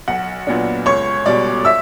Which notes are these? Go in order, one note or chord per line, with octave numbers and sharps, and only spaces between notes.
B1 F#5
A#2 F#3 B3 D4
C#2 C#5 C#6
B2 G3 D5 D6
E5 E6